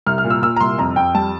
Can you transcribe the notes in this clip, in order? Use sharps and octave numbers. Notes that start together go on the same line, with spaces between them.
C2 F6
F6
A#2
E6
A#2 E6
A#5
C2 C6
F2 A#5
F2 G5
G3 A5